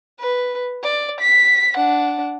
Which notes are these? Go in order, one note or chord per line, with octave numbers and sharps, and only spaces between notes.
B4
D5
B6
D4 F#5